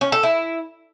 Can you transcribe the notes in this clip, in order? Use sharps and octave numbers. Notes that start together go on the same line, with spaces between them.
C#4
A4
E4